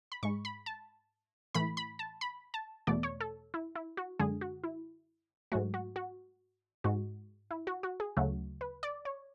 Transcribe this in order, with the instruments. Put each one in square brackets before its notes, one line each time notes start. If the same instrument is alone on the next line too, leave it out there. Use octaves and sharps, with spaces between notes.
[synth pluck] B5
G#2 G#3 C#6
B5
A5
A2 E3 A3 B5
B5
A5
B5
A5
E2 B2 A3 D5
C#5
A4
E4
E4
F#4
F#2 D3 G#3 G#4
F#4
E4
G#2 F#3 A3 F#4
F#4
F#4
G#2 G#3 F#4
E4
F#4
F#4
G#4
D2 C#3 F#3 A3 F#4
B4
D5
C#5